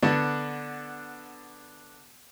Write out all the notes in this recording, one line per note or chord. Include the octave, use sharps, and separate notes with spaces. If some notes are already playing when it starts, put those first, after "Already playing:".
D3 B3 D4